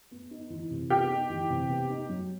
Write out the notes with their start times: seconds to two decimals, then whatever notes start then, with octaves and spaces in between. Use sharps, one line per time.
0.11 B3
0.31 D#4
0.50 E3
0.71 C3
0.90 B3 G4
1.10 D#4
1.30 E3
1.50 C3
1.70 B3
1.90 D#4
2.09 F#3